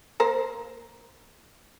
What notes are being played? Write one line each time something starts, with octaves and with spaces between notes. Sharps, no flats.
A#3 A#4 C5